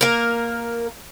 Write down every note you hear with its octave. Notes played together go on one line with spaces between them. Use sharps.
A#3 A#4